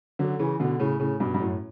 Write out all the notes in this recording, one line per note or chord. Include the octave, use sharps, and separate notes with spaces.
D3 F#3
C#3 E3
B2 D3
A2 C#3
A2 C#3
G2 B2
G2
F#2 A2